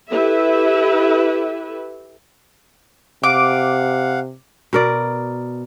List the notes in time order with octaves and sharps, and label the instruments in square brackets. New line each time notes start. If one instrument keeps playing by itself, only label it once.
[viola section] E4 G4 A4 B4 E5
[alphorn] C3 [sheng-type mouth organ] F5 F#5 [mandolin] D6
[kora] B2 A#4 D5